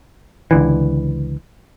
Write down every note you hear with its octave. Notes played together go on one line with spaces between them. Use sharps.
C#2 D3 E3